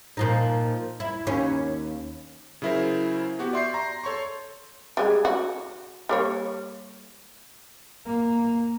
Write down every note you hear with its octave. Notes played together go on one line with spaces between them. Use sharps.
A#2 F3 D#4
E4
D#2 C#4
C#3 F#3 E4 A#4 C5
B3 F#4 G4
D5 E5 C6 C#6 G6 C7
A#5 C6
A4 C#5 C6 C#6
G3 G#3
F#4
G3 A#3 C#5
A#3